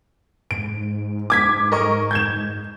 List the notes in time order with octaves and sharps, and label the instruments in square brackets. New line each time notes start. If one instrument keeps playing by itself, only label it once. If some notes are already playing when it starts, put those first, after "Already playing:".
[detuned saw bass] G#2 [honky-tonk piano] D7
[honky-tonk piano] D6 G#6 B6
A#4 D#5 C#6
G6 G#6 E7